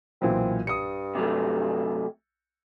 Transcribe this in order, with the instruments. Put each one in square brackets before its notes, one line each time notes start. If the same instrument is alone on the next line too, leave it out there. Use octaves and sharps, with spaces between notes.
[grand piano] B1 A#2 E3 [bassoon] C4
[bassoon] G2 [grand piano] D#6 C#7
[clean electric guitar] C3 F#3 A3